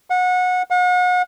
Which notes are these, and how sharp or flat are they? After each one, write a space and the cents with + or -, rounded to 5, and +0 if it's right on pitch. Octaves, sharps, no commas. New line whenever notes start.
F#5 -25
F#5 -40